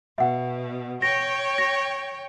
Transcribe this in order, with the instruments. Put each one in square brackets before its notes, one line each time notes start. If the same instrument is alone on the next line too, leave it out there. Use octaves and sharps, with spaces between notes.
[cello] B2 [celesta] E5 F#5
[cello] C#5 G5 [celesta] A#6
[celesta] A#6